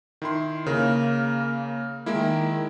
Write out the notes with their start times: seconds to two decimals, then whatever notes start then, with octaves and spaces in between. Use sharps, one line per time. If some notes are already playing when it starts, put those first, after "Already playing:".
0.22 D#3 E4 C6
0.66 C#3 A#3 A#4
2.06 D#3 G#3 A#3 E4